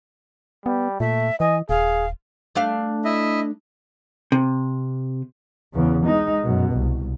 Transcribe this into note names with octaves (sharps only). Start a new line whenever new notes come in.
G3 B3
A#2 A3 E5
E3 D#5 G#5
D#1 G#4 F5
A3 D4 F5
E4 D#5 E5
C3
E2 C#3
G#3 D#4
F#2 B2
C2